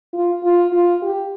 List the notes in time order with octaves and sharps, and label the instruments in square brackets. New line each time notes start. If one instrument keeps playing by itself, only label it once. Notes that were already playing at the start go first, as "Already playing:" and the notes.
[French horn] F4
F4
F4
G4